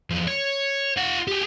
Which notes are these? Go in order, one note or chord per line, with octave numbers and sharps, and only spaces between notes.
E2 F3
C#5
F4 F#5
G4 G#4